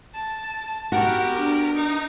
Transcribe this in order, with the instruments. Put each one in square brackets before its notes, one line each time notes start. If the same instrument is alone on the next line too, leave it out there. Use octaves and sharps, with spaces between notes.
[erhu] A5
[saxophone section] B3 G4 [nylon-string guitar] F#4 [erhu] A#4
[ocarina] D4
[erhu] D#4